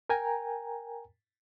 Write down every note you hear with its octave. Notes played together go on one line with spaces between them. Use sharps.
A#4 G5 G#5 A#5